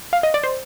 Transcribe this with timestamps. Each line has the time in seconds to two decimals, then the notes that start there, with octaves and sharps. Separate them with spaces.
0.13 F5
0.23 D#5
0.34 D5
0.43 C5